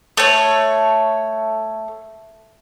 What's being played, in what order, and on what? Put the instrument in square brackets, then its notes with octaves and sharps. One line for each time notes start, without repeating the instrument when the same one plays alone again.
[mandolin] A3 C#5